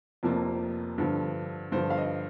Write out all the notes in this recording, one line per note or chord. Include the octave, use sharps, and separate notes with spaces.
F1 F2 C3 F3 A#3
G2 D3 F3
G2 D3 F3 C5
F5
D#5